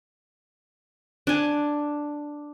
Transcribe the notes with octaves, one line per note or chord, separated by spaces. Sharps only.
D4 G#5